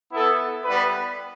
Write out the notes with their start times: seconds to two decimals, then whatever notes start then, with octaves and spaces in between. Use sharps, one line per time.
0.10 B3 E4 A4
0.64 G3 B3 E4 B4